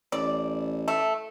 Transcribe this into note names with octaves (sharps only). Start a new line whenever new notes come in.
A1 D5
A3